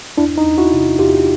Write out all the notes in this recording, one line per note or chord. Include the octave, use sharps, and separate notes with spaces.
E2 D4 E4
D#4
E2
E4 F#4
C3
E2 F4 G4